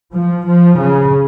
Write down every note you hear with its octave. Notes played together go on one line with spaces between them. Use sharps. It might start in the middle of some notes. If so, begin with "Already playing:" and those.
F3
F3
C#3